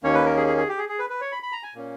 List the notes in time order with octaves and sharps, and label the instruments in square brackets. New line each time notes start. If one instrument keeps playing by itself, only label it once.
[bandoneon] D#2 D#3 A#3 C#4 C#5
B4
A#4
G#4
G#4
G#4
G4
G#4
G#4
B4
B4
C#5
B5
B5
A#5
G#5
A#2 A#3 C#4